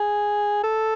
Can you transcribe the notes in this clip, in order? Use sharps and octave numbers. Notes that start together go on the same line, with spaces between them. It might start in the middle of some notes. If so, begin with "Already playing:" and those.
Already playing: G#4
A4